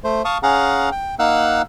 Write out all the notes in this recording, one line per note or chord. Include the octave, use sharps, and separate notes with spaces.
A3 C5
F5 A5 C#6 D#6
C#4 G#4 F5 F#5 A#5
G5
A#3 D#4 F5 F#5 E6 F#6